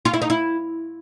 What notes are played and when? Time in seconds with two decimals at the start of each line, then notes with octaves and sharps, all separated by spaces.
0.05 F4
0.13 E4
0.22 D#4
0.30 E4